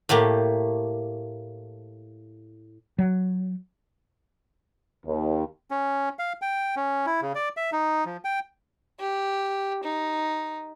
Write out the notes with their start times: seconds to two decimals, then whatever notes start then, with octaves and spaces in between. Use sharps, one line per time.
0.09 A2 A3 A#3 G4
2.99 F#3
5.06 D#2
5.71 C#4
6.19 F5
6.42 G5
6.76 C#4
7.07 E4
7.22 C#3
7.35 D5
7.57 E5
7.73 D#4
8.05 F3
8.25 G5
9.00 G4
9.83 D#4